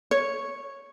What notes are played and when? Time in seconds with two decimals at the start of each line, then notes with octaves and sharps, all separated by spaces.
0.11 C#5